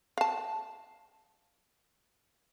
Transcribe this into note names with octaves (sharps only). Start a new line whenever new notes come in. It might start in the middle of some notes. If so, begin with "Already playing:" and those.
F5 A5